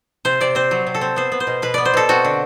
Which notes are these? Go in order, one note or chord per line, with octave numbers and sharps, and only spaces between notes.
C3 C5
C3 D5
C4 C5
F#3
C3
A4
C4
B3 C5
B3
C5
B2
B2 B4
B3 D5
C5
B2 A4
C4 F#4
D3